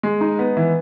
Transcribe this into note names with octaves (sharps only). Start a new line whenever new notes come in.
G#3
D#4
B3
E3